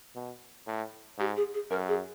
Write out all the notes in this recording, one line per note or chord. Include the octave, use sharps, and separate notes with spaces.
B2
A2
G#2 G4
G#4
G#4
F#2 A#4
G#4